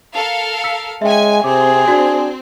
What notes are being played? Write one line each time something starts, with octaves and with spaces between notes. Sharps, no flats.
A4 A#4 F5
E6 B6 C#7
G#3 C#4 E5 G5 G#5
C3 C4 G#4 D6
D4 F#4 G#6